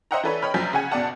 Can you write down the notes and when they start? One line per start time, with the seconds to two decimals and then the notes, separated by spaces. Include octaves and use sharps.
0.11 C5 D#5 E5 F#5 G5 A#5
0.23 E3 D4 A4 B4 C#5
0.42 C#5 D#5 G5 B5 F6
0.54 A#1 F3 F#3 G#5 G6 B6
0.73 C#3 C#4 F#5 G#5
0.92 G1 B2 D4 D5 F#5 A5